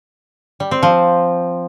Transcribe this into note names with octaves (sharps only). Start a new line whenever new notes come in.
G3
C4
F3